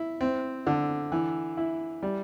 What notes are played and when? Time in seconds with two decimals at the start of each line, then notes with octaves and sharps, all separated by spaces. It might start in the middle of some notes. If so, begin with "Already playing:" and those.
Already playing: E4
0.21 C4
0.67 D3
1.12 E3
1.57 E4
2.03 G3